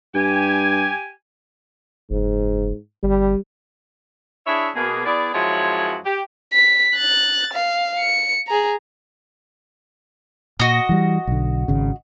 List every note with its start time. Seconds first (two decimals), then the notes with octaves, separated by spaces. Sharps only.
0.15 G2 G4 G#5
2.10 F#1 G#2
3.03 G1 G3
4.47 D4 E4 G#4 C#5 E5
4.75 B2 A#3 G#4
5.06 B3 E4 G#4 D5
5.34 F#2 F3 G#3 E4 F#4 C#5
6.05 G4
6.53 B6
6.96 F#6 A6
7.53 F5
7.99 C#7
8.48 G#4 A#5
10.60 A#2 F#4 D#5
10.89 E3 G3
11.27 B1 D3
11.68 G#1 C#3